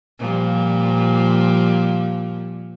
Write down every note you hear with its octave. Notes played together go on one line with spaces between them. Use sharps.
A#2 F3 G3